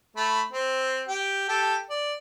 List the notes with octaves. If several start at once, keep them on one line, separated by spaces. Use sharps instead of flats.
A3 B5
C4
G4
G4 A4
D5